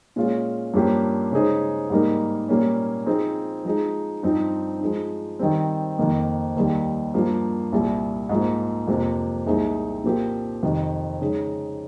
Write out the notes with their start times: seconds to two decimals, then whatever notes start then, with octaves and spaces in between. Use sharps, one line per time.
0.16 A#2 G#3 C#4 F4
0.74 G2 F3 A#3 C#4 G4
1.32 C#3 G#3 D#4 G#4 C5
1.90 G#2 G3 A#3 D#4 A#4
2.49 A#2 G3 A#3 C#4
3.06 F3 C4 D#4 G#4
3.65 F3 G#3 D#4 G#4
4.23 G2 F3 C4 D#4
4.81 F3 G#3 D#4
5.39 D#3 G3 C4
5.98 F2 D#3 A#3
6.56 D#2 D#3 G3
7.14 G2 F3 A#3
7.72 C2 A#2 G3
8.29 G#2 F3 A#3
8.88 F2 C3 F3 A#3
9.46 C2 A#2 G#3 C4 D#4
10.04 A#2 F3 C4 G4 A#4
10.63 F2 C3 D#3
11.21 C#3 G#3 D#4